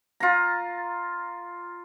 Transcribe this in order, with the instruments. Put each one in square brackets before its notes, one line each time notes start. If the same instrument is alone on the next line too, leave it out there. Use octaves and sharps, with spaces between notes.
[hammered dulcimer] F4 A#5